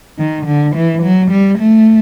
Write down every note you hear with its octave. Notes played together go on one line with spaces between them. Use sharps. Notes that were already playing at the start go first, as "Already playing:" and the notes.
D#3
D3
E3
F#3
G3
A3